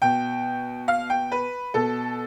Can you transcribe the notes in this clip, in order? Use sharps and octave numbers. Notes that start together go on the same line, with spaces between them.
B2 G5
F5
G5
B4
B2 A4